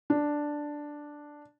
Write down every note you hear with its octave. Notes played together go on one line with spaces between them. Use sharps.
D4